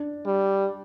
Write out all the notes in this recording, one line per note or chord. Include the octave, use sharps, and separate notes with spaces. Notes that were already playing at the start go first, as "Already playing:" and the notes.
Already playing: D4
G3